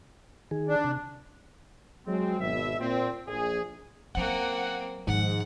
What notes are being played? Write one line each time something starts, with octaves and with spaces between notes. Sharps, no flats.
D#3 G#4
D4
C3
F#3 G#3 C4
G#1 B2 E5
A#2 C4
A#1 G#4
F#3 A#3 C4 C#4 F#5
G#2 D#3 F3 F#5